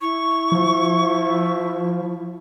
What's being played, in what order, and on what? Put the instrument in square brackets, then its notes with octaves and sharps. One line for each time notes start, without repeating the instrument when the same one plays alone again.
[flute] E4 [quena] C#6
[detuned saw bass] F3